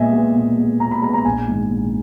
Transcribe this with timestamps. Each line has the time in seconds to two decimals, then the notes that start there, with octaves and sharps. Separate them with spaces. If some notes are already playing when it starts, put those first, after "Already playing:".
Already playing: A#2 G#3 B3 D#5 E5 G#5
0.13 G#3 B3
0.35 A#2
0.58 G#3 B3
0.80 A#2 A#5
0.91 B5
1.02 G#3 B3 A#5
1.13 A#5
1.25 A#1 G#5
1.47 G#2 D#3
1.70 A#1